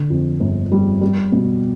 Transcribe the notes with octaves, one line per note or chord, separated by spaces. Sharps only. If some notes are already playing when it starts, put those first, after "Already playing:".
Already playing: D3
F2
G1
G3
G3
B2